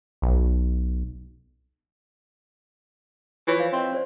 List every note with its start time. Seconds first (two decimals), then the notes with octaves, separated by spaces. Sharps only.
0.22 B1
3.47 E3 F4 C#5 C#6
3.59 C5 F5
3.73 C4 D#5 E5
3.92 C#4 C5 D5